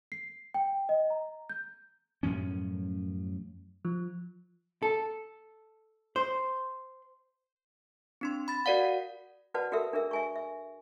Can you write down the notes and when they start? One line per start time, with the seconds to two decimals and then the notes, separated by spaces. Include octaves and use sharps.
0.12 C7
0.54 G5
0.89 D#5
1.10 A#5
1.49 G6
2.23 F#2 A2 F3 C#4
3.85 F3
4.83 A4
6.16 C5
8.21 C4 D4 C6
8.48 B5 A6
8.66 F#4 A#4 D5 F5 F#5
9.54 F#4 B4 D5 F#5 A5
9.72 F#4 G4 A4 A#4 E5
9.93 D4 G#4 A#4 E5
10.11 E5 G#5 C#6
10.36 E5